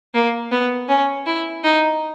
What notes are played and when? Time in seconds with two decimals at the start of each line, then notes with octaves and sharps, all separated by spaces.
0.14 A#3
0.51 B3
0.88 C#4
1.26 E4
1.64 D#4